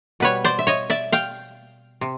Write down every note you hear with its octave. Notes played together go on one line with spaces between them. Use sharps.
B2 G3 B4 C#5
C5 D5
E5
C#5 D#5
D5 E5
F5 G5
C3